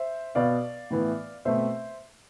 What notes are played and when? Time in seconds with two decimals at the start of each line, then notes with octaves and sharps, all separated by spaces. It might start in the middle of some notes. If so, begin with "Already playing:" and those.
Already playing: C5 E5
0.35 B2 B3 D5 F5
0.90 A2 E3 B3
1.45 B2 A3 C4 C5 E5